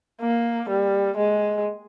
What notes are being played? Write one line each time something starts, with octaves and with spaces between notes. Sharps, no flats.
A#3
G3
G#3